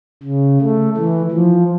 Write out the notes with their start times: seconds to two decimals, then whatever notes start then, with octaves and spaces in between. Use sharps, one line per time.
0.23 C#3
0.61 A3
0.97 E3
1.32 F3